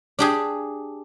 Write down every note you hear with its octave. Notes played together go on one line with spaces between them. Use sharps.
D4 G4 G#4